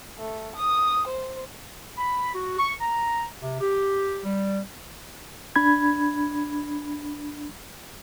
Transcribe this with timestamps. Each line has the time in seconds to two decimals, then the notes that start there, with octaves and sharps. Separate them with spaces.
0.19 A3
0.55 D#6
1.07 C5
1.98 B5
2.34 F#4
2.59 C#6
2.81 A#5
3.41 C3
3.61 G4
4.24 G3
5.56 D4 B5 G#6